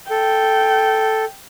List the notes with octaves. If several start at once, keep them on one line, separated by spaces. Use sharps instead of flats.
A4 G5